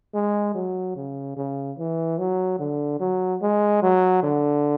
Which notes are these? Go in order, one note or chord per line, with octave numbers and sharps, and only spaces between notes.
G#3
F#3
C#3
C#3
E3
F#3
D3
F#3
G#3
F#3
D3